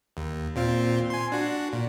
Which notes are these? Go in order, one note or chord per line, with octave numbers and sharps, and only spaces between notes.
D#2
A#2 C4 F4
G#5 C6
D4 F#4
A#2